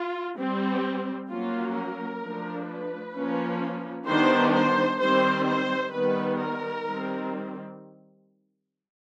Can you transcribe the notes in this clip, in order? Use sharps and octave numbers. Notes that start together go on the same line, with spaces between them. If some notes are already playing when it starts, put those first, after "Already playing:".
Already playing: F4
G3 C4
F#3 A#3 C#4 F4
A#4
F3 A3 D4
B4
F3 A#3 C#4
D#3 G3 B3 D4 C5
C5
D#3 G3 C4 C5
C5
D#3 G3 B3 B4
A#4
D#3 G3 C4